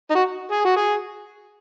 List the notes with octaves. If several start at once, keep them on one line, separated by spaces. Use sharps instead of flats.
D#4
F#4
G#4
F#4
G#4